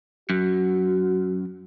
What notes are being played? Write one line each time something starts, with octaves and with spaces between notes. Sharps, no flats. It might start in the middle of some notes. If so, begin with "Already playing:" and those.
F#2 F#4